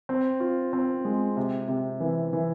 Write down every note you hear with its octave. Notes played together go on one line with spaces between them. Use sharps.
C4
F4
C4
G#3
C3
C3
E3
E3